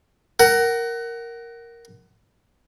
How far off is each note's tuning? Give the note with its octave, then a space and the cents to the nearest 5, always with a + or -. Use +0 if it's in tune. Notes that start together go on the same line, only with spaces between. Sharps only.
A#4 +0 F#5 +25